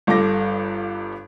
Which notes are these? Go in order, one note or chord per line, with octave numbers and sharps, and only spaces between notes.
G1 G2 A4 D6 A#6